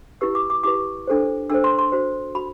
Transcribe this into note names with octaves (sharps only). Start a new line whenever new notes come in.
E4 G4 B4 E6
D6
D6
E4 G4 B4 D6
D4 A4 C5
D4 A4 C5 E6
C6
C6
F#4 C5
F#4 B5